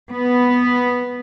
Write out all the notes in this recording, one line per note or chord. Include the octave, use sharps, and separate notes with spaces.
B3